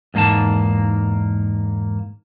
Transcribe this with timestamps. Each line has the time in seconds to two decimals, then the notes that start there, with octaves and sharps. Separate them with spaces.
0.14 E2 G#2 A#3 D#4 A5